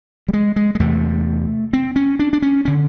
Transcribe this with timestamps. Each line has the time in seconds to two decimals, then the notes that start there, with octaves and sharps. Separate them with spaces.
0.28 G3
0.33 G#3
0.56 G#3
0.75 G#3
0.79 E2 C3 A3
1.73 C4
1.96 C#4
2.19 D4
2.33 D4
2.42 C#4
2.65 D3 C#4